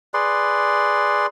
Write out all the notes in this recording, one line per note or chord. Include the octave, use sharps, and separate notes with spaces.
G#4 B4 D5 C6